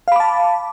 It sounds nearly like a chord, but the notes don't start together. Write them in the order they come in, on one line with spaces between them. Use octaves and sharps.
F5 B5 D6 A5